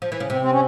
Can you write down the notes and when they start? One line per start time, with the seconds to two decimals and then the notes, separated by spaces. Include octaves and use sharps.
0.02 F3
0.12 E3
0.20 C#3
0.30 C3 C4
0.41 C4
0.51 C#4